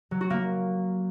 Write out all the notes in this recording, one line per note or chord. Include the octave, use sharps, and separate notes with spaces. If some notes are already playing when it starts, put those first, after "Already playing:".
F#3
F#4
A#3